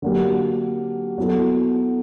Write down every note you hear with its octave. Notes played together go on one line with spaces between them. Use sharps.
D3 F#3 A#3 D4 G4
F#3 B3 E4 A4